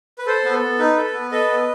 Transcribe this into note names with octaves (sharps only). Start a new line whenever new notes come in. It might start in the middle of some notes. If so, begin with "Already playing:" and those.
B4
A4 C5
B3 B4
A4
B3
D#4 B4
A4
B4
B3
A4 B4 D#5
B3